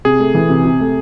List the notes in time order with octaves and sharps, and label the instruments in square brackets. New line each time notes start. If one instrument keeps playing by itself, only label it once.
[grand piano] C3 [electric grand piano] G#4
[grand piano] A3
E3
C3
C3
A3